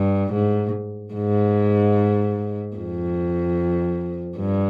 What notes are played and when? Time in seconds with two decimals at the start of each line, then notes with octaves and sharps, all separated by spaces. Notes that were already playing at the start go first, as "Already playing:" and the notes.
Already playing: G2
0.33 G#2
1.14 G#2
2.76 F2
4.37 G2